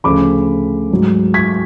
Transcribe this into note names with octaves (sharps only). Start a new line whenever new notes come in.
D2 C#3 F3 B5 D6
G#2 F#3
G#6 B6